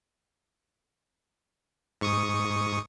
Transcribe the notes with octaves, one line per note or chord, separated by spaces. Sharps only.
G#2 C#6 D#6